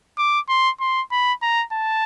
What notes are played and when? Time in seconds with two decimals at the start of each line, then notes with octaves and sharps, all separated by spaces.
0.18 D6
0.49 C6
0.80 C6
1.11 B5
1.42 A#5
1.73 A5